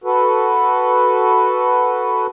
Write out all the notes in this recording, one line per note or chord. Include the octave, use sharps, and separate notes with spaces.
F#4 A4 B4